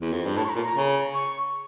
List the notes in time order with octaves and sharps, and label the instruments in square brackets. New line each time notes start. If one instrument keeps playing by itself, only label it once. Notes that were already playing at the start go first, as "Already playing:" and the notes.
[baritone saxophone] E2
F2
G2
[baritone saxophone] A2 [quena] A5
[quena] C#6
A#5
[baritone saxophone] A#2
[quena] A#5
[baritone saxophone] C#3
[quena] C#6